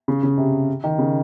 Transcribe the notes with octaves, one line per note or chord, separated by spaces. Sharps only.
C#3
C#3
C3
D#3
C#3